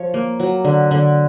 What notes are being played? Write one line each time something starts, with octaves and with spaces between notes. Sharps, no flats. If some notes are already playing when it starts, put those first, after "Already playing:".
Already playing: F3 C#5
A#3
F#3
D3
D3